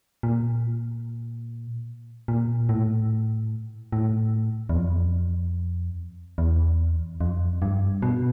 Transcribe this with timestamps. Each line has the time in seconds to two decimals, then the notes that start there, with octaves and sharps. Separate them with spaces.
0.23 A#2
2.28 A#2
2.69 A2
3.92 A2
4.69 E2
4.75 F2
6.38 E2
7.21 F2
7.62 G2
8.02 B2